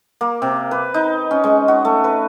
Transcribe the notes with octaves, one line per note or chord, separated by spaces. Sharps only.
A#3
C3
B4
D#4
C#4
G#3
F#4
A3
B4